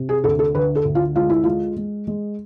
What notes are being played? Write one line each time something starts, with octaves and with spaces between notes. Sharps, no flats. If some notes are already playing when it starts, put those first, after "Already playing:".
Already playing: C3
G#4
D2 A4
A4
D3 B4
A4
D2
F4
G#3 F4
E4
G#3 F4
G#3
G#3